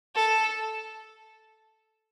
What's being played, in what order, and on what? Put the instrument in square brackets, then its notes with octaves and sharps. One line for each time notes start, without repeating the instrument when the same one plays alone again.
[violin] A4